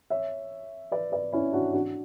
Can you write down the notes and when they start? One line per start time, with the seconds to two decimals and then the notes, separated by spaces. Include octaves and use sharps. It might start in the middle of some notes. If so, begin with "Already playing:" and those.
0.10 C#5 E5
0.92 B4 D5
1.12 B4 D5
1.33 C#4 E4
1.53 D4 F#4
1.73 D4 F#4